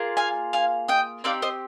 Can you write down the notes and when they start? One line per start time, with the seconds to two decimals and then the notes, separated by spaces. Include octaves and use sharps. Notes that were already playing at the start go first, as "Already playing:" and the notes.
Already playing: A#3 F4 G#4
0.17 F5 G#5
0.53 F5 G#5
0.88 D#5 G5
1.24 C4 D#4 G4 D5 F5
1.42 C5 D#5